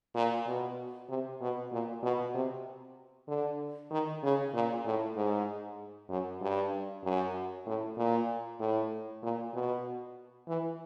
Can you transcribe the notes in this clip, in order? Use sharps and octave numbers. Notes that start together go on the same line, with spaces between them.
A#2
B2
C3
B2
A#2
B2
C3
D3
D#3
C#3
A#2
A2
G#2
F#2
G2
F#2
A2
A#2
A2
A#2
B2
E3